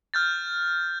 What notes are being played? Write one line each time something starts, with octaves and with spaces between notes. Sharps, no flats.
F6 G6 A6